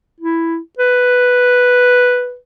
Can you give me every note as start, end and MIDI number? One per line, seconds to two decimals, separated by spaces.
0.21 0.58 64
0.79 2.36 71